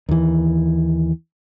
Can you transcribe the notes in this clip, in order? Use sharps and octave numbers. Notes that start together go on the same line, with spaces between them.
D#2 E3